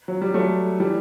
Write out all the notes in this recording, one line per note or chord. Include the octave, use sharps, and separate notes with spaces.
F#3
G3
F#3 A3
E3 G3